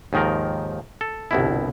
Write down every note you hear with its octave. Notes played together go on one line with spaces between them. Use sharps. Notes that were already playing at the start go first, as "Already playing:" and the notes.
D#2 G#2 D#3 F3 A#4
A4
G1 C2 B2 E4